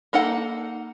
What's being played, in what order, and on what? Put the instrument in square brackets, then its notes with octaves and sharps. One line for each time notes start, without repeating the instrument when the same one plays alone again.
[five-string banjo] A#3 D#4 A4 F#5